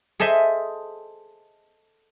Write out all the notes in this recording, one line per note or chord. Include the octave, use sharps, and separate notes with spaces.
G#4 A4 C5 D#5 E5